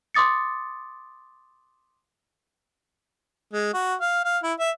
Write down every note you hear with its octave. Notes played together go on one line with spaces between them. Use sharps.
C6 D6 D#6 A6 C#7
G#3
F#4
F5
F5
E4
E5